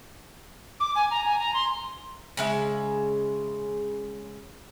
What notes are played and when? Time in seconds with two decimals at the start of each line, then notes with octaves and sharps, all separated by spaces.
0.80 D6
0.95 G#5
1.11 A#5
1.25 G#5
1.39 A#5
1.54 C6
2.37 C#3 G#3 E5